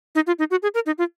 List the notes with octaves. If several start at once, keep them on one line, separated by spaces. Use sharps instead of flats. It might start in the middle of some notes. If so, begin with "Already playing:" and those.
D#4
F4
D#4
F#4
G#4
A#4
D#4
F4